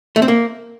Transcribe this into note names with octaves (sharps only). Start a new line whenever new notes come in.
A3
C4
A#3